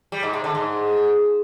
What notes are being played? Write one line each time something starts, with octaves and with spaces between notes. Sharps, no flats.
G3
G#2
C3
D3
G#2